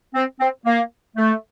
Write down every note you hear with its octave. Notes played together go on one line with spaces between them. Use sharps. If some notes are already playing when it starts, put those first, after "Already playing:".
C4
C4
A#3
A3